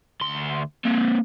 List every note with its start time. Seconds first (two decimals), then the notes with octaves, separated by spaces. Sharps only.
0.21 D2 C6
0.85 A#3 C4